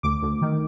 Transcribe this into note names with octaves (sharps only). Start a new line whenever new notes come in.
D2 D6
D2
D#3